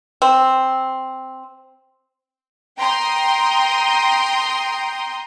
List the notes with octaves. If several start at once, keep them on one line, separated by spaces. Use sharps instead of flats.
C4
G5 A#5 C6 D#6 G6